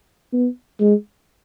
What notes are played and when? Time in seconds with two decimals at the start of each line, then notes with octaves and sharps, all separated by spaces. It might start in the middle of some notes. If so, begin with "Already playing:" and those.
0.33 B3
0.80 G#3